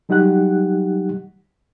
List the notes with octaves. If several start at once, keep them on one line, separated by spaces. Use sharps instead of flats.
F#3 G3 D#4 G4 F#5 F#6